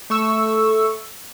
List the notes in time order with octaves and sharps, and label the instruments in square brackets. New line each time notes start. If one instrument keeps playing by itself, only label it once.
[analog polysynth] A3 C#6 E6